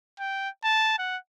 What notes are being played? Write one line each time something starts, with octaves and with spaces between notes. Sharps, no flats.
G5
A5
F#5